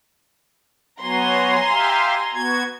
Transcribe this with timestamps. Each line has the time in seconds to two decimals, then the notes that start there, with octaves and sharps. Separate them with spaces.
1.01 F#3 B3 F#4 G#5 A#5 C6
1.69 G4 E5 F5
2.34 B3 F#4 G#6